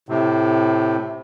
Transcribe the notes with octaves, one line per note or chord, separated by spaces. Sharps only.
A2 C3